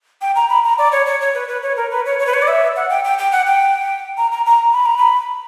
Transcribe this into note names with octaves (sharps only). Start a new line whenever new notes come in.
G5
A#5
B5
A#5
D5
C#5
C#5
C#5
B4
B4
C#5
A#4
B4
C#5
C#5
B4
C#5
D5
E5
F#5
G5
G5
G5
F#5
G5
A#5
A#5
A#5
B5
A#5
B5